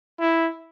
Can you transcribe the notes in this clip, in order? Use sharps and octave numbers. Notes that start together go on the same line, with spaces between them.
E4